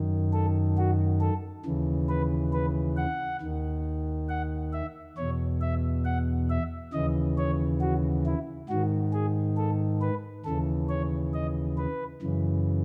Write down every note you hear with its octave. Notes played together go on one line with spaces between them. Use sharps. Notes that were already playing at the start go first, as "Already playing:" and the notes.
Already playing: F#2 D#3
A4
F#4
A4
D#2 C#3 E3
B4
B4
F#5
D#2 D#3
F#5
E5
E2 B2 C#5
E5
F#5
E5
D#2 C#3 E3 D#5
C#5
F#4
E4
G#2 D#3 F#4
G#4
A4
B4
D#2 C#3 E3 A4
C#5
D#5
B4
F#2 C#3 E3